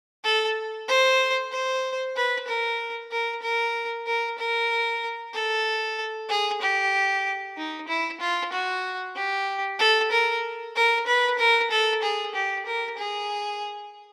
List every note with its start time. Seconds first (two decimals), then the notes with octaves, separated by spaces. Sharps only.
0.24 A4
0.88 C5
1.52 C5
2.16 B4
2.47 A#4
3.12 A#4
3.43 A#4
4.07 A#4
4.39 A#4
5.34 A4
6.29 G#4
6.62 G4
7.57 D#4
7.88 E4
8.21 F4
8.53 F#4
9.16 G4
9.79 A4
10.12 A#4
10.76 A#4
11.07 B4
11.39 A#4
11.71 A4
12.02 G#4
12.35 G4
12.66 A#4
12.98 G#4